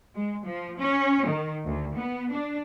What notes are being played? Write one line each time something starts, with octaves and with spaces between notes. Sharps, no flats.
G#3
F3
C#4
D#3
D2
B3
D4